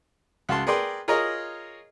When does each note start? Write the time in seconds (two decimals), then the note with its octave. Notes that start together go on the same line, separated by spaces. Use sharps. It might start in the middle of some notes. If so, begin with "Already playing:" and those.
0.49 C#2 F#4 A5 C6
0.67 G#4 A#4 B4 D5 G5 C6
1.08 F4 G#4 A#4 C#5 D#5 A#5